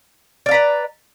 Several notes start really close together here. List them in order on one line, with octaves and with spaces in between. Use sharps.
D5 F5 A#5 B4